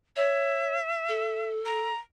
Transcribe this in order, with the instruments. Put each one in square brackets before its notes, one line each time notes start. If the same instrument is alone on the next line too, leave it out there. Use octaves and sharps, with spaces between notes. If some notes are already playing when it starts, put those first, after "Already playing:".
[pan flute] C#5 [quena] E5
[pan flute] A4
[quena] A#5